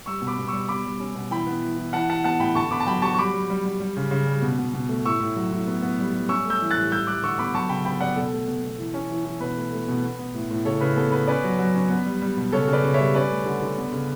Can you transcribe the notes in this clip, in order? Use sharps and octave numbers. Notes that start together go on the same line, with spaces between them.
G3 C#6 E6
B2
B5 D6
B2
G3 C#6 E6
B2 B5 D6
G3
C#4
B2
E3 G5 B5
B3
E3
E3
E3 F#5 A5
E3 F#5 A5
B3 F#5 A5
A2 G5 B5
D3 A5 C#6
B3 B5 D6
A5
F#3 G5 B5
F#3 A5 C#6
C#6
G3 B5 D6
G3
G3
G3
G3
C#3
C#3
G3
B2
B2
B2
A3
A2 C#6 E6
A2
F#3
A2
B3
B3
G3
G3
C#4 C#6 E6
A3 E6 G6
E3
F#6 A6
A2
G3 E6 G6
G3 D6 F#6
D3 C#6 E6
B3 B5 D6
F#3 A5 C#6
C#3 G5 B5
B3 G5 B5
B3 D5 F#5
B2 A4
A3
B2
B2
E3
C#4
E3
E3
B2 B4
A3
A3
B2
B3
B3
A2
A2
C#3 A4 C#5
C#3 B4
B3 A4
B3 B4
C#4 B4 D5
F#3
F#3
C#4
B3
G3
G3
B2
C#3 A4 C#5
C#3
B4 D5
C#3
G3 C#5 E5
C#4 B4 D5
A3
D3
D3
B3
C#3